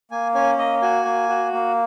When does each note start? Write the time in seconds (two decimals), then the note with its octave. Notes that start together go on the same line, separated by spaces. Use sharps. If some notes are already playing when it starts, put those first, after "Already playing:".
0.11 A#3 G#5
0.34 C#4 G#5
0.58 A#3 D#5
0.81 F#4 G#5
1.05 A#3
1.29 F#4
1.53 A#3